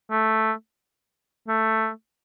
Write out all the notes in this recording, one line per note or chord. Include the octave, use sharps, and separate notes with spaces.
A3
A3